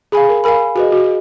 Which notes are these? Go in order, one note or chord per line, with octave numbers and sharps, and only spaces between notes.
G#4 F5 G#5 B5
A#4
A#4 F5 G#5 B5
F#4 G#4 B4 D#5
F#4